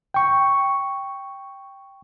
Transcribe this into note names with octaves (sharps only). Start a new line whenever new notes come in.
G5 C#6